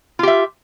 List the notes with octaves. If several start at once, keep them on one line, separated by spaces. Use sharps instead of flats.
F4 G4 E5